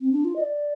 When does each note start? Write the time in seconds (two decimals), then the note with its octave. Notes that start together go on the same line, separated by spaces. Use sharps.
0.01 C4
0.12 D4
0.25 F4
0.36 D#5
0.40 D5